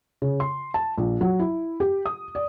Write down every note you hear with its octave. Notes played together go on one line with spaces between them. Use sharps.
C#3
C6
A5
A#1
F#3
E4
G4
D#6
D5